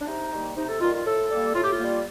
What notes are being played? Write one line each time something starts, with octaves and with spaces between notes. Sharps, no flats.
D4
C3 D#4
D#3 G3 A#3
C3 D#4
A4
D#3 G3 A#3 F4
F4
A2 A4
G3 A#3
A2 F4
G4
F4
G3 A#3